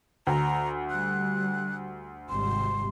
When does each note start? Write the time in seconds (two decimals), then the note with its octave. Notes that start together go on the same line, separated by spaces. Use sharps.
0.27 D2 A#5
0.90 G3 F#6
2.29 G#1 C3 G3 C6